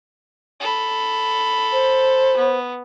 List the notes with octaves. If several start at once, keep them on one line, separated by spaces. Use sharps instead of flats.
A4 B5
C5
B3